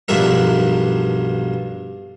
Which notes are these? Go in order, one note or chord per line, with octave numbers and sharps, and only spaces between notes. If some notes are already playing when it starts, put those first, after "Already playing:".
B1 G2 F3 D4 A#4 E5